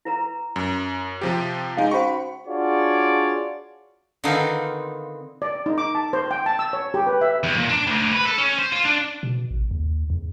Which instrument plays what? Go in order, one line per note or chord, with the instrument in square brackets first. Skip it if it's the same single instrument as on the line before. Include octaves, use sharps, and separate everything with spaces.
[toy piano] E4 B4 A#5
[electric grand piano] F#2
C3 F3 G4
[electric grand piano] G#3 D#4 [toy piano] F5 G#5
[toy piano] C#4 F#4 C5 [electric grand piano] B5 C#6
[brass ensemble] D4 F4 F#4 G#4 C#5 D5
[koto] D3 D#3 B3 C4 D#4 F4
[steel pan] D5
D#4
D6
A5
C5
G5
A5
E6
C#5
G4
B4
E5
[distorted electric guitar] E2
A#2
D4
D2
B4
A4
C#4
C5
F4
D4
[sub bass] B2
A1
D#2
E2